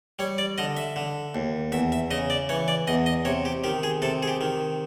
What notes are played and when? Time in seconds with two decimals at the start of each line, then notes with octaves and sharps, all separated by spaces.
0.19 G3 C#5
0.38 D5
0.58 D3 D#5
0.77 E5
0.96 D3
1.35 D#2
1.72 E2 E5
1.92 E5
2.11 C#3 D#5
2.30 D5
2.49 E3 C#5
2.68 D5
2.87 E2 D#5
3.06 D#5
3.25 C3 C#5
3.45 G4
3.64 D#3 G4
3.83 G#4
4.02 C3 A4
4.23 G#4
4.28 G4
4.41 D#3